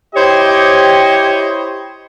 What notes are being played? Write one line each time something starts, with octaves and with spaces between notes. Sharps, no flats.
E4 G4 C5 C#5 D#5